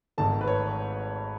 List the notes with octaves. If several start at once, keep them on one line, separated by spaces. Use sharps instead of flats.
G#1 G#2 D#3 A3 A5
B4
C#5